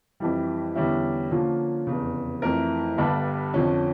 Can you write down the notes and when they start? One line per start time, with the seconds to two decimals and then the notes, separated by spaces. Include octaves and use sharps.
0.20 F2 E3 G3
0.75 E2 D3 G3 C#4 E4
1.31 D3 F3 A#3 C#4 F4
1.87 F1 E2 C#3
2.42 F2 E3 A3 E4 A#4
2.98 G1 G2 D3 G3 D4
3.54 F2 D3 F3 C#4